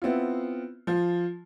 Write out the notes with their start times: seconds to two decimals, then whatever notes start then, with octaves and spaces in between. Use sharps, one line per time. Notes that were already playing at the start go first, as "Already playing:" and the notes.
0.02 B3 C4 E4 F4
0.87 F3 F4